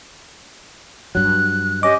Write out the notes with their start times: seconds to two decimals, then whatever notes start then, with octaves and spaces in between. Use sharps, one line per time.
1.15 G2 F#3 F#6
1.83 C#4 G4 D#5 D6